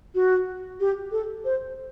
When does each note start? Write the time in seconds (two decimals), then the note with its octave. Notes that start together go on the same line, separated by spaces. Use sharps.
0.15 F#4
0.80 G4
1.12 A4
1.45 C5